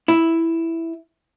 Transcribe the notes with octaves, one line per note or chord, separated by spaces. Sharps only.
E4